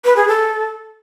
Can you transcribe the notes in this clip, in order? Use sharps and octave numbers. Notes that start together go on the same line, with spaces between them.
B4
G#4
A4